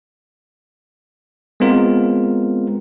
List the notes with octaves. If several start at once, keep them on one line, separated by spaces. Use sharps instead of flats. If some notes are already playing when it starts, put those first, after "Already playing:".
G#3 B3 C4 F4 A#4